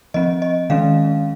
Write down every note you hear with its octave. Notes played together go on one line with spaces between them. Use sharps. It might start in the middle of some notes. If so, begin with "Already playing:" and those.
F3 C4 D#5
D#5
D#3 G#3 C#4 F5